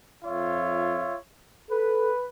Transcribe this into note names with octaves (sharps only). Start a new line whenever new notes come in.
F2 F4 C#5 E5
A4 B4